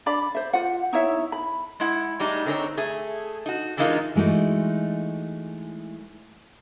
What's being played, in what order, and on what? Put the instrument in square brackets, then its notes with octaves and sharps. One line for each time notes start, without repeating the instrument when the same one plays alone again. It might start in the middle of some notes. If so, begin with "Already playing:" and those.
[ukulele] D4 D5 B5
C5 E5
F4 F#5
D#4 E4 C#5 E5
B5
[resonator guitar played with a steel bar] G#3 E4 F#5
A2 G3 G#3 D#4
D3 C4 D#4 G#4 C#5
A3 G#4
D#4 F#4
D3 E3 G#3 A#3 D#4 F4
[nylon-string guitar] E3 G#3 A3 D#4 F#4